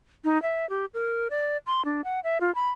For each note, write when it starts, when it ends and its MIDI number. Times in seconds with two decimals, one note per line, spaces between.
0.24 0.41 63
0.42 0.68 76
0.70 0.86 67
0.94 1.28 70
1.30 1.57 74
1.67 1.84 84
1.85 2.01 62
2.04 2.20 78
2.24 2.38 76
2.41 2.54 65
2.55 2.70 83